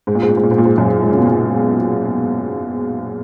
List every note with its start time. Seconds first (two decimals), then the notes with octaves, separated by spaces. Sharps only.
0.07 G#2
0.15 A#2
0.22 G#2
0.29 A#2
0.37 G#2
0.44 A#2
0.51 G#2
0.58 A#2
0.65 G#2
0.78 F#2
1.03 G#2
1.11 C#3
1.18 B2
1.26 A#2